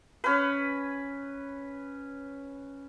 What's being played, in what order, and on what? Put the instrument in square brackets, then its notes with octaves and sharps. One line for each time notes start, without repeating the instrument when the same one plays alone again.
[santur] C#4 B4